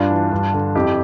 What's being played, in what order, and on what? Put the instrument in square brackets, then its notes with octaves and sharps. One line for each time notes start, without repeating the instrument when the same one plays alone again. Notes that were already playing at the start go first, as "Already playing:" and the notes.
Already playing: [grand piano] G2 D4 F4
E3
G2
D3
F2 E4 G4